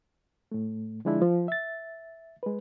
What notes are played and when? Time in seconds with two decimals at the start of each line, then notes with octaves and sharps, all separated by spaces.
0.52 A2 A3
1.05 D3 F3 G#3 D4 E4
1.22 F3
1.48 E5 A6
2.43 G#3 B4